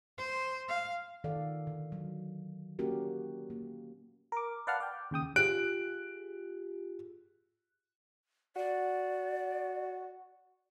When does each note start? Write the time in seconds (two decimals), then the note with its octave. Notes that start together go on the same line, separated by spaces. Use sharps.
0.18 C5
0.69 F5
1.24 D#3 A4 D5 F5 F#5
1.67 D3
1.92 F#3
2.79 A#3 C#4 F#4 G4 A#4
3.50 A#3
4.32 A#4 D6
4.67 B4 D5 F5 F#5 A5 F6
4.80 D5 G5
5.11 D#2 C#3 G5 D#6
5.36 F4 G4 G#4 F#6 D7
8.56 F#4 D5